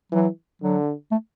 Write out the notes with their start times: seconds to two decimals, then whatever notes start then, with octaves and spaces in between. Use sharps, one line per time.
0.12 E3 F#3
0.62 D3 F#3
1.11 A3